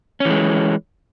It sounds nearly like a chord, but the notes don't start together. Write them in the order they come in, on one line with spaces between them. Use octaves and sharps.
C#4 E3 G#3